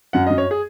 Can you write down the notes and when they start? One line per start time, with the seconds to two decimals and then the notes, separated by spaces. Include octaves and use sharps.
0.13 F#2 F#5
0.26 D#5
0.30 F#2
0.38 C#5
0.51 G#4